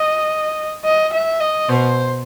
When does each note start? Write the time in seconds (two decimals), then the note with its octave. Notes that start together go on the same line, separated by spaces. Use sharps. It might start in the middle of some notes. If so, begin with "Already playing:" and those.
Already playing: D#5
0.85 D#5
1.13 E5
1.41 D#5
1.69 B2 C5